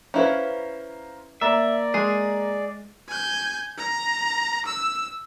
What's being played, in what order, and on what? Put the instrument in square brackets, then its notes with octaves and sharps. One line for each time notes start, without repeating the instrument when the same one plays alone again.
[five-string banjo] C#4 E4 B4 [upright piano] C5 F5 A#5
[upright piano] A#3 A#5 [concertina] D5 [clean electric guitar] E5
[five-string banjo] G#3 [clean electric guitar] G#4
[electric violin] G#5 G6
A#5
E6